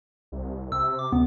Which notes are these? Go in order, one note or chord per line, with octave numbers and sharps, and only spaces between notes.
C2
C3 E6
D6
D2 B3